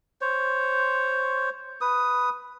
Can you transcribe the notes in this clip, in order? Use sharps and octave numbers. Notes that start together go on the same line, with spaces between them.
C5 C#5
B4 D#6